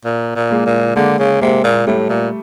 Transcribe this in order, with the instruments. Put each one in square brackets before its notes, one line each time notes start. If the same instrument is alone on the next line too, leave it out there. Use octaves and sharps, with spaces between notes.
[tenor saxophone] A#2
A#2
[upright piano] G#3 A#3
[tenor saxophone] A#2
[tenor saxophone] D3 [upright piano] G#3 A#3
[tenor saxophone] C#3
[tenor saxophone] C3 [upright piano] G#3 A#3
[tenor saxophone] A#2
[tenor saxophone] A2 [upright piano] G3 A3
[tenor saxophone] A#2